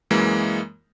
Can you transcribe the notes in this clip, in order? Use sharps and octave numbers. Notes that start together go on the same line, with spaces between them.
F#2 E3 G#3 A#3